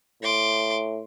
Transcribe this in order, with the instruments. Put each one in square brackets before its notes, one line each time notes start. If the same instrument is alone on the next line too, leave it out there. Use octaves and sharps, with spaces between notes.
[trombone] A2 [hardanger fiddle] C6 D6